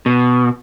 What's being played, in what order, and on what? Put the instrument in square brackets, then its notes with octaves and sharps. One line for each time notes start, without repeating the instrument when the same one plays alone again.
[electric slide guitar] B2